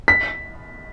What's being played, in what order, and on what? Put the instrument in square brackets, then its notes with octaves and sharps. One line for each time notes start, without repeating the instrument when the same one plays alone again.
[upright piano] B6